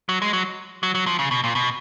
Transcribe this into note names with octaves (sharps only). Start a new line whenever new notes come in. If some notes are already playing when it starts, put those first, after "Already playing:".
F#3
G#3
F#3
F#3
F#3
F3
C#3
B2
A#2
B2